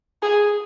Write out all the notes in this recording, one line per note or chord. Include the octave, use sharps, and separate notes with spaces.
G#4